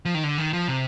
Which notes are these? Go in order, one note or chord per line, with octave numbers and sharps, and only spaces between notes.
F3
D#3
D3
D#3
F3
C3